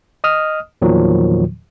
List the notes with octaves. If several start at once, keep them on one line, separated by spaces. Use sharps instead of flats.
D#5 D#6 F6
E2 A#2 D#3 F3 F#3